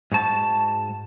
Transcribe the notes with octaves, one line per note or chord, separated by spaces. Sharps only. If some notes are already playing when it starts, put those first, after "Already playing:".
G#2 F#4 A5